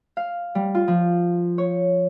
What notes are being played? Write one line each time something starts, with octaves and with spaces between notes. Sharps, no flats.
F5
G3
F4
F3
C#5